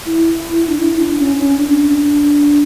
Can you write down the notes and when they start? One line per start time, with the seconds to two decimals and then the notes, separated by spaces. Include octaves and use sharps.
0.06 E4
0.69 D4
0.81 E4
0.99 D4
1.18 C#4
1.37 C#4
1.56 D4